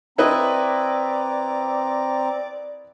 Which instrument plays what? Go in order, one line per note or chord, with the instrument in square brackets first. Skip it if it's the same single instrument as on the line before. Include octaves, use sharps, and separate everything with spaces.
[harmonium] C4 A#5 [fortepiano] E4 B4 D#5 [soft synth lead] D5